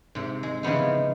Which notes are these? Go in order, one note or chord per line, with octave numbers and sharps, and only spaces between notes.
G#2 C3
G#3
C#3 E3 F3 B3 D#4